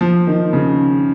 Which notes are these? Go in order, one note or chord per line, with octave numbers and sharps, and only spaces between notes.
F3
D#3
C#3